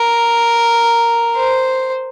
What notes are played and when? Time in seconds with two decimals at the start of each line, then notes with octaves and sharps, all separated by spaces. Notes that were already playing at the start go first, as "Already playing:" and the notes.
Already playing: A#4
1.37 C5